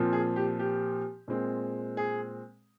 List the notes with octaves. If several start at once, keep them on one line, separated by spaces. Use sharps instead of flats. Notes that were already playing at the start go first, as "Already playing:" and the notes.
Already playing: A#2 F3 C4
G#4
G4
G4
A#2 G#3 C4
G#4